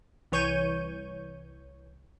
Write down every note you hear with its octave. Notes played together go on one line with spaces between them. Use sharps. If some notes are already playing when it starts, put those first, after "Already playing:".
C2 E3 C#5 C#6 G6 D#7